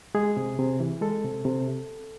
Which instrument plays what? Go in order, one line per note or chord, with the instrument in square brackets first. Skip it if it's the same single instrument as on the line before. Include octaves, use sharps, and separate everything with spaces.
[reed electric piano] G#3 G#4
C3
C3
E3
G#3 A4
C3
C3